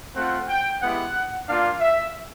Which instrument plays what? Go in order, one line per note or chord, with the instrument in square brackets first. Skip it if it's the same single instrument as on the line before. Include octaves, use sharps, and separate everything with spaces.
[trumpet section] A3 C4 F4 F#5
G5
G#3 B3 E4 G4 F#5
A#3 D4 F4 F5
E5